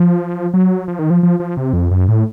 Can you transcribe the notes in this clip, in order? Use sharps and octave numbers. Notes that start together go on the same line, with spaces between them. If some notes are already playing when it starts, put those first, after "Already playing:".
Already playing: F3
F#3
F3
D#3
F3
F3
F3
C3
F2
F#2
A2